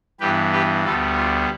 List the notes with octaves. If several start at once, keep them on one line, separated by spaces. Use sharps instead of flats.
G2 E3 B3 G4 B4
G4 B4
D2 D3 G3 B3 F4 A4
F4